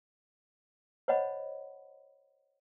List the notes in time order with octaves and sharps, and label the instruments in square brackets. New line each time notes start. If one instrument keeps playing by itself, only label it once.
[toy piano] C5 C#5 D#5 F#5 B5